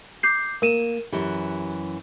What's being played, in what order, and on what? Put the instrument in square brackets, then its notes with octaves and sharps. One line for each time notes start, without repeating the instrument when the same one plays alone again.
[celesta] D6 G6 C7
[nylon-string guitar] A#3 [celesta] A#4 D#7 E7
[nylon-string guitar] F#2 E3 [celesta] G4